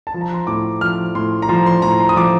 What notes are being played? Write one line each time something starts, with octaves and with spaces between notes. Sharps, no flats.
A5
F3
A#5
C6
A2 D6
F3 F6
A2 C6
A#5
F3 C6
C6
A2 A#5
C6
D#6
F3 D6